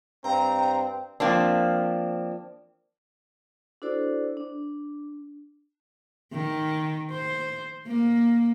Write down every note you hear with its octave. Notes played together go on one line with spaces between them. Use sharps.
G2 C4 G5 A#5
F3 A#3 C4 D4
D4 E4 F#4 A4 C5 D5
D4
D#3
C5
A#3